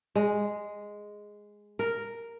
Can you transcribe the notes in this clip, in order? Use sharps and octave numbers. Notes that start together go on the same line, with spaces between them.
G#3
A#4